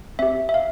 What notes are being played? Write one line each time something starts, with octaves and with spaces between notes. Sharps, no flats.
C4 G4 E5
E5
F5